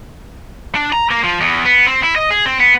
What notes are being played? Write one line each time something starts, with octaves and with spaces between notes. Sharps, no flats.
D4
A#5
A#3
F3
E2
B3
C4
E4
D#5
G#4
C4
B3